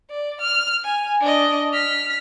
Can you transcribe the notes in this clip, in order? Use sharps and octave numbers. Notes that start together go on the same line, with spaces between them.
D5
F6
G#5
D4 D#5
F6 B6